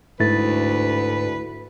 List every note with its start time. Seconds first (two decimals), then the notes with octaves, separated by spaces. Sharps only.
0.20 D2 G#2 A3 E4 B4 A6